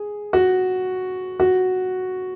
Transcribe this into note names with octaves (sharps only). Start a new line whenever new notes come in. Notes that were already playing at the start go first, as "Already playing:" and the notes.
Already playing: G#4
F#4
F#4